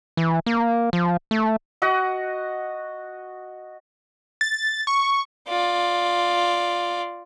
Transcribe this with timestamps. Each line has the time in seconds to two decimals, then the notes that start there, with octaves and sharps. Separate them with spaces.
0.17 E3
0.46 A#3
0.93 F3
1.31 A3
1.82 F#4 D#5 F#5
4.41 A6
4.87 C#6
5.48 F4 D5